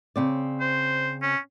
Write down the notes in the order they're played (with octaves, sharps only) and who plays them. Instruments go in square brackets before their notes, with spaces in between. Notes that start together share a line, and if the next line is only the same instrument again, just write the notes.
[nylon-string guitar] C#3 C4 D5
[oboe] C5
C#4